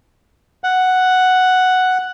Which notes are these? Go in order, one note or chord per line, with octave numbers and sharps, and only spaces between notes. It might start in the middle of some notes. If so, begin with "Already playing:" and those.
F#5